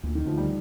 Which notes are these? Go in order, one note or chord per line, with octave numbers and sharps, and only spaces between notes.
D2 A#2
D#3
D2 F3
G3